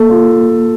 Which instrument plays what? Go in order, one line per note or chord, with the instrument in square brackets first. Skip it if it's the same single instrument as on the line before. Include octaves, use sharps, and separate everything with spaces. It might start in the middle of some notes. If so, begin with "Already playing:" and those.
Already playing: [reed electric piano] A#3 [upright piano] A4
[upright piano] F4